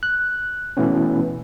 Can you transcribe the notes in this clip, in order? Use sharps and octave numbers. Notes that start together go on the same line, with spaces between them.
F#6
B2 E3 A3 B3 C#4